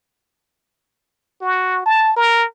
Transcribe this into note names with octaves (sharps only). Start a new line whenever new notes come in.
F#4
A5
A#4